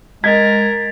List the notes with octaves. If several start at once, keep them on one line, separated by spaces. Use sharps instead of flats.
G#3 A#4 D#5 G#6 A6 B6